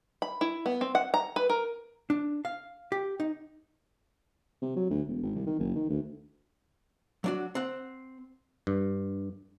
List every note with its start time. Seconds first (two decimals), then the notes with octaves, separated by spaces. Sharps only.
0.22 B5
0.41 E4
0.66 B3
0.81 C4
0.95 F#5
1.14 A#5
1.36 B4
1.50 A#4
2.10 D4
2.45 F5
2.92 G4
3.20 D#4
4.62 C3
4.76 F#3
4.90 D2
5.08 E1
5.23 G#1
5.35 C2
5.46 D#3
5.59 F#1
5.76 D#3
5.89 D2
7.24 F#3 D4 F#4
7.55 C4 F#5
8.67 G2